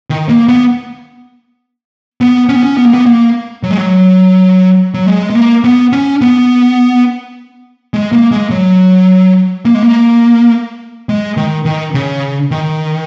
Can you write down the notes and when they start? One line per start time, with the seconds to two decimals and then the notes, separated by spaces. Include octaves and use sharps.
0.10 D#3
0.29 A#3
0.49 B3
2.21 B3
2.49 C#4
2.56 B3
2.63 C#4
2.77 B3
2.86 A#3
2.94 B3
3.06 A#3
3.63 F#3
3.71 G#3
3.77 F#3
4.94 F#3
5.06 G#3
5.30 G#3
5.35 A#3
5.64 B3
5.93 C#4
6.21 B3
7.94 G#3
8.13 A#3
8.31 G#3
8.50 F#3
9.65 A#3
9.74 G#3
9.82 A#3
11.09 G#3
11.37 D#3
11.65 D#3
11.94 C#3
12.51 D#3